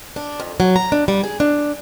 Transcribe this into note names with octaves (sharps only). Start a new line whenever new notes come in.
D4
F2
F#3
A#5
D4
G3
G#4
D4